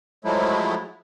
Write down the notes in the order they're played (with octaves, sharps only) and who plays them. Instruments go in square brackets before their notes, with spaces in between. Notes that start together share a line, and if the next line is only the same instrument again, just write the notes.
[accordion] F3 F#3 G#3 A3 E4